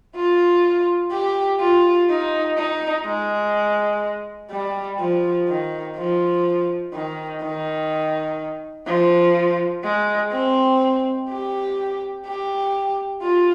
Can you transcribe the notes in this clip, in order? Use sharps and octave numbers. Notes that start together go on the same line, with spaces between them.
F4
G4
F4
D#4
D#4
G#3
G3
F3
D#3
F3
D#3
D#3
F3
G#3
C4
G4
G4
F4